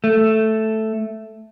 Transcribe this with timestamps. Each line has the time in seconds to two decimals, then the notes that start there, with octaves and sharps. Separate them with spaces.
0.04 A3